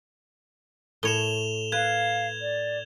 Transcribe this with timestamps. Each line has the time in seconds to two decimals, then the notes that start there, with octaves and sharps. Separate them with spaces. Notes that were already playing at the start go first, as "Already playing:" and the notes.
1.03 A2 C#5 E7 F7 G7
1.72 B4 F5 G#6
2.41 D5